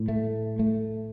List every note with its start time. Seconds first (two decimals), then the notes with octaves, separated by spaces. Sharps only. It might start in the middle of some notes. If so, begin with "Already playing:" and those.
Already playing: A2
0.08 A3
0.59 A3